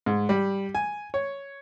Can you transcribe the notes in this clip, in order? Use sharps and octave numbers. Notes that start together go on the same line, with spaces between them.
G#2
G3
G#5
C#5